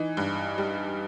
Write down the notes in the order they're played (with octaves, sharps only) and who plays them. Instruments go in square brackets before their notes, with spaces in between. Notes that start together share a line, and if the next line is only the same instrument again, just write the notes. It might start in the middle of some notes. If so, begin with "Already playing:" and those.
Already playing: [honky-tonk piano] E3 [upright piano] D#4
[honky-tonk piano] G2
G3